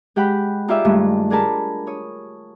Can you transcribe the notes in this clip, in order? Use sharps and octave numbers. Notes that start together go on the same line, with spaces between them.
G#3 G4 F#5 G5 B5 F#6
D#4 F4 G4 G#4 D5 E5
G2 D#3 G#3 A3
D4 G#4 A#4 A5 B5
C#5 D#6